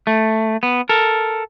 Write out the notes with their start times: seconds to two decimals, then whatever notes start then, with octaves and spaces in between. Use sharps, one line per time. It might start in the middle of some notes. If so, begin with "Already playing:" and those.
0.07 A3
0.63 B3
0.89 A4 A#4